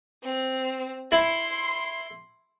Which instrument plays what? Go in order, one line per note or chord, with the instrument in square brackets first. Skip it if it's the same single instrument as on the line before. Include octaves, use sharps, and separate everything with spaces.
[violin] C4
[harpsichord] E4 [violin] C6